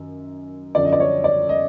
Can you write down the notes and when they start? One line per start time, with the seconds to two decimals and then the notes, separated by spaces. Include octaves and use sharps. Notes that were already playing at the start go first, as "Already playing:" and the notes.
Already playing: F#2 D#3
0.75 F#2 D3 F3 D5
0.85 D#5
0.93 D5
1.00 C#5
1.24 D5
1.49 D#5